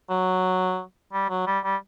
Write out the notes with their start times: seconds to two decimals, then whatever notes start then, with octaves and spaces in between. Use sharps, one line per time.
0.10 F#3
1.13 G3
1.30 F#3
1.47 G3
1.64 G3